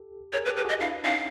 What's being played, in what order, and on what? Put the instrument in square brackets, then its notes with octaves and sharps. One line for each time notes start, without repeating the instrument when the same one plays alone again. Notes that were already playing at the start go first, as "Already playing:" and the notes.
Already playing: [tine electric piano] G4 A4
[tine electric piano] G#4 A#4 [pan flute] C#5
[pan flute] B4
[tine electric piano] G4 A4
[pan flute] B4
[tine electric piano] F#4 G#4 [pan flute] D#5
[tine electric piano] D4 E4 [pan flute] F5
[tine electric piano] C#4 D#4 [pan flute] F5